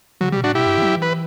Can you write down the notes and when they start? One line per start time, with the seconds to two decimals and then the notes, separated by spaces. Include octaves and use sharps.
0.21 C#3 F#3
0.32 B2 G3
0.44 A2 D4 F#4
0.55 B2 E4 G4
0.66 G2
0.78 E3
0.82 F#3
0.97 E3
1.02 B4